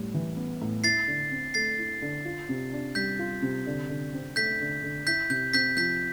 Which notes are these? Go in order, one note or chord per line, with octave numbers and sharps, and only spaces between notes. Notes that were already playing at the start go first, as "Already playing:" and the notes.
Already playing: A2 G3 B3
E3
B3
A2
E4 A6 C7
D3
C4
A3 A6 C7
E4
D3
F4
C3
D4
G3 G6 B6
F4
C3
D3
D3
C4
A3 G6 B6
D3
D3
E4 G6 B6
C3 G6
C4 G6 B6
F3 G6 B6